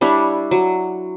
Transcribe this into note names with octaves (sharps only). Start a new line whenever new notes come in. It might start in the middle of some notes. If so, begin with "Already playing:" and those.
G3 D4 E4 C#5
F#3